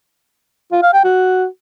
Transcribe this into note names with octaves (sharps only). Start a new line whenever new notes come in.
F4
F5
G5
F#4